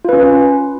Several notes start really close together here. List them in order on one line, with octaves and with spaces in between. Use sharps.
F4 B4 C#4